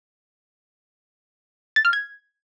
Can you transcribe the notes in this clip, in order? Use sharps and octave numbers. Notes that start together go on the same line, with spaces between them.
A6
F6
G#6